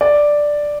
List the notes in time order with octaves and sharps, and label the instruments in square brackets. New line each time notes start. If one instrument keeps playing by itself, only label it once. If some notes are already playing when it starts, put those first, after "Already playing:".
[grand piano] D5